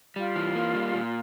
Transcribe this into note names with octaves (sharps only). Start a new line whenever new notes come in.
G3 F4
E3
A#3
G3
A#2